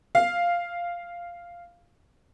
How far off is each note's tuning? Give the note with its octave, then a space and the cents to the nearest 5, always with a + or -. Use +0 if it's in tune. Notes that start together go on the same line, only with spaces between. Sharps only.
F5 -5